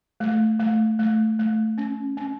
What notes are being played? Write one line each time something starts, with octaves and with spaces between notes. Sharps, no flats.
A3
A3
A3
A3
C#4
C#4